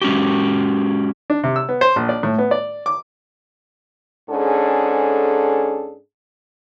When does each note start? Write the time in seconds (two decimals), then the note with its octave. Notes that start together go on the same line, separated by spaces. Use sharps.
0.02 G#3 C#4 F#4 G4
1.30 D4
1.44 C3
1.56 E6
1.69 B3
1.81 C5
1.96 A#1
2.09 D5
2.23 A2
2.38 B3
2.51 D5
2.86 D6
4.30 G#2 C#4 D4 G#4 A4